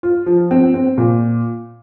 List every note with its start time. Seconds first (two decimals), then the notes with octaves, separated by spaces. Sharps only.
0.03 F4
0.26 F3
0.51 C4
0.74 C4
0.98 A#2